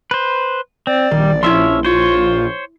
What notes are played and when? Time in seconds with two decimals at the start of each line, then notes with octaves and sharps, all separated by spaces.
0.11 B4 C5
0.87 C4 D5
1.11 A#1 D#3 G3
1.43 F3 C#4 E4 E5 C6
1.85 F4 C5 C#5